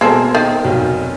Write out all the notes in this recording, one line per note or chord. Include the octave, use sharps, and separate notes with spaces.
B2 G#3 A#3 C4 A4 A#4
D#3
F1 B1 F#3